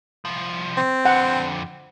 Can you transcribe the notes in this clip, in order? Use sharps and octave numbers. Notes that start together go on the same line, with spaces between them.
C2 F3
C4
F2 D3 F#5